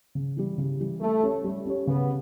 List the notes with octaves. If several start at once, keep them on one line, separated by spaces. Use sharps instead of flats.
C#3
E3 G3
C#3
E3 G3
G3 A3
C#4 G4 C#5
G3
C#4 G4 C#5
C#3 B3